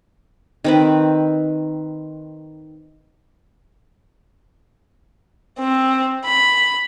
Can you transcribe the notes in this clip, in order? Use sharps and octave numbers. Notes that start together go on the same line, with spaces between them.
D#3 C4 B4
C4
B5